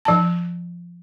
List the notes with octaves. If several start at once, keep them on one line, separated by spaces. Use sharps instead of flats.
F3 A5